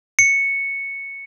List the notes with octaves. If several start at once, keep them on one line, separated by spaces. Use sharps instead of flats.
C#7